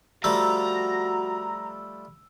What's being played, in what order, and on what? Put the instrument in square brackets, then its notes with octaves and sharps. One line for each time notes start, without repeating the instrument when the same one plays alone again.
[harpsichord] F3 G3 A3 [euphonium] F#4 [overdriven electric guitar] A#5 [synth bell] E6